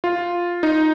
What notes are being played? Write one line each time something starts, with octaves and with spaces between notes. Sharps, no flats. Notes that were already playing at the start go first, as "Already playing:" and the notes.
F4
D#4